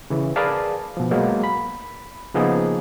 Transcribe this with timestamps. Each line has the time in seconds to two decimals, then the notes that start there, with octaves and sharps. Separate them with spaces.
0.10 C#3 E3
0.36 G#4 A#4 B4 D5 F5 A5
0.97 B2 F3
1.11 F#3 G#3 A#3 B3
1.44 B5
2.34 C#3 F3 A#3 B3 D#4 G#4